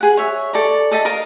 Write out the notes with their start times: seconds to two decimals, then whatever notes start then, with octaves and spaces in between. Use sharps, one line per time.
0.01 G#4 F#5
0.17 C#5 E5
0.53 A4 D5 A#5 C#6
0.91 A4 D#5 E5 A5
1.05 A#4 D#5 F5